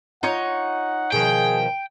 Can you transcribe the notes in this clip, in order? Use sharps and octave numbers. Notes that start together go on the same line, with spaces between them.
D#4 F4 C#5 F#5
B2 D#3 F3 G#4 G5